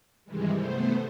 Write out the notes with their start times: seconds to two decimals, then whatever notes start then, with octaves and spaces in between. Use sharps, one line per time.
0.25 G2 C3 D#3 E3 G3 G#3
0.54 A3 B3 C5